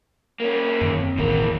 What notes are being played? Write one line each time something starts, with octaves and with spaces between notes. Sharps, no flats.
A#3 C#4
F#2 D#3
C4
E1 A1 F#2 D#3 A#3